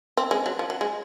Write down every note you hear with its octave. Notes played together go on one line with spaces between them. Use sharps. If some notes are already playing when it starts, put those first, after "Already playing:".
C4
G#3
F#3
F3
F#3
G#3